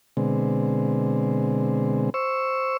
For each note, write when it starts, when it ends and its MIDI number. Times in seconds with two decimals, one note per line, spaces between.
0.17 2.10 47
0.17 2.10 50
0.17 2.10 56
0.17 2.10 60
2.14 2.77 72
2.14 2.77 85
2.14 2.77 88